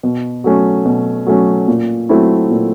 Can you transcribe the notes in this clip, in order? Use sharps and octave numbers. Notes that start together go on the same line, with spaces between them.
B2
F#3 A3 C#4
B2
F#3 A3 C#4
A#2
F#3 A3 C4 E4
A#2